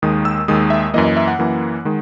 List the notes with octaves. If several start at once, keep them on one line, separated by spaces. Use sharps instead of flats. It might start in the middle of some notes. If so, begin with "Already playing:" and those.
D#2 D#3 G#3 D#6
E6
D#2 D#3 G#3 D#6
E5
F#2 E3 A#3 D#5
D#5
E5
F#5
F#2 E3 A#3
D#3 G#3